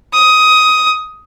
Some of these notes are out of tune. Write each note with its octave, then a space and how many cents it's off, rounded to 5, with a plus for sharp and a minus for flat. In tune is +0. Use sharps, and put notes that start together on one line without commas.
D#6 +15